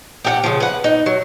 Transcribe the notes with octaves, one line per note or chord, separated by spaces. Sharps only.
G4 G#4 F#5
C#3 F3
B4 F#5
D#4
F#3